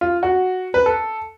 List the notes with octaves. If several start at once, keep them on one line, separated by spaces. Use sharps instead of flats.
F4
F#4
B4
A4